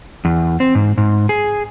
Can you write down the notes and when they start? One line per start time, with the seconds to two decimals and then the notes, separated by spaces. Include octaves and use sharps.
0.25 E2
0.60 C4
0.75 G#2
0.97 G#2
1.29 G#4